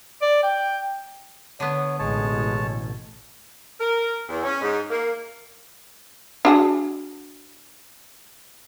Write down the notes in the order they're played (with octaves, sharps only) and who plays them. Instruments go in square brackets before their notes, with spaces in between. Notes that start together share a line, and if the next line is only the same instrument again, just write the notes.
[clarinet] D5
G5
[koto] D3 B3 [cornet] C#5
[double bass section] A1 B2 [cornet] G#3 [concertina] C#5 A5
[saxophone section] A#4
E2
C#4
G#2
A#3
[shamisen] D4 F#4 G#4